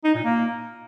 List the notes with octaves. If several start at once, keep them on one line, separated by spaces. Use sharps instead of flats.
D#4
A#2
A#3